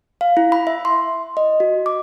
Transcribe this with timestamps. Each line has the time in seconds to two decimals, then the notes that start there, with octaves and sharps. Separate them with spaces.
0.21 F5
0.37 E4
0.52 B5
0.67 E5
0.85 C6
1.37 D#5
1.60 F#4
1.86 D6